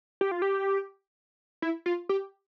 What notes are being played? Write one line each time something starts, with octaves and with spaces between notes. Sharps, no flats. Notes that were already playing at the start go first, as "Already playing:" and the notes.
G4
F4
G4
E4
F4
G4